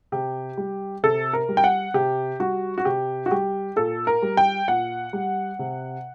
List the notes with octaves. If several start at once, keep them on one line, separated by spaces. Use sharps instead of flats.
C3 G4
G3
C3 A4
A#4
G3
G5
F#5
C3 G4
G3 F#4
F#4
C3 G4
F#4
G3 G4
A#2 A4
A#4
G3
G5
A#2 F#5
G3
C3